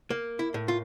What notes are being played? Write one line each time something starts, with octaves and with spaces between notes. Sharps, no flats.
A#3
E4
A2
F4